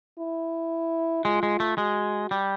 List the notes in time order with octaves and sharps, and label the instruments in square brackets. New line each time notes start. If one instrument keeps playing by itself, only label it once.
[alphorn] E4
[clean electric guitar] G#3 [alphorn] F4
[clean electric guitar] G#3
A3
[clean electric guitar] G#3 [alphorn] F#4
[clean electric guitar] G3